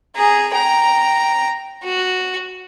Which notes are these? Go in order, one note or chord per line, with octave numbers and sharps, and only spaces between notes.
G#4 A#5
G5 A#5
F#4